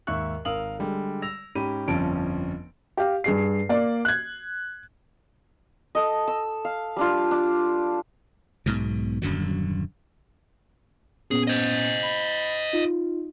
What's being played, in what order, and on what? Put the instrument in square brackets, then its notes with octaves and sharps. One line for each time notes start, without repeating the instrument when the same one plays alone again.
[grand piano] D#2 G#2 E5 C#6 F#6
G#1 A#4 F5 D#6 E6 F#7
D3 G3 G#3
E6 A#6 F7
G#2 C#4 G4 B5 D#7
G1 F2 F3 C#4 A5 D7
[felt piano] G4 F5
G2 G#4 C7
A#3 D5
F#6 G#6
[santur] A4 D#5
E6
F5
G3 D4 F4
D4
[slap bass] B1 G#2 B2
D#1 F#2 D3 F#3
[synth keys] A#2 B3 C#4 [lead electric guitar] G#4
[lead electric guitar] C5 D#5
[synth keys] B5 A6
D#4 F4